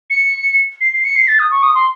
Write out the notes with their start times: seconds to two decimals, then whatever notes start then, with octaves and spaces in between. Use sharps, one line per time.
0.10 C#7
0.81 C7
0.93 C7
1.04 C#7
1.16 C7
1.28 A6
1.39 D#6
1.51 C#6
1.63 D#6
1.75 C6